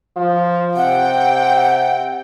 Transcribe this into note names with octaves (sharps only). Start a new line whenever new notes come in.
F3
C3 F#5 G5